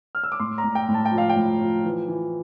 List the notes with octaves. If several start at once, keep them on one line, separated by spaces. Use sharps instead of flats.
F6
E6
D6
A2 C6
A#5
A2
G5
A2
A5
G5
F3
F5
G5
A2
F3
E3
E3